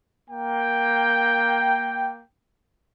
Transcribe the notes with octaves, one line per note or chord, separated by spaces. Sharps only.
A#3 G5